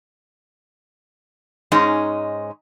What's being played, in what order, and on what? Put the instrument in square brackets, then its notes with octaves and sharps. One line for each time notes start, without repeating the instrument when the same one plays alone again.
[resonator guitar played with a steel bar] G#2 G#3 C#4 D#4